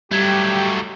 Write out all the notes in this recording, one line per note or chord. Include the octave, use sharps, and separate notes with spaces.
F#3 G3 A3 G4 G#6